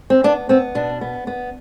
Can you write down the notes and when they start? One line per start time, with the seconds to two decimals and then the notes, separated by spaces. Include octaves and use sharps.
0.10 C4
0.24 B3 D4
0.49 B3 C4
0.75 B2 D4
1.01 B3
1.27 B3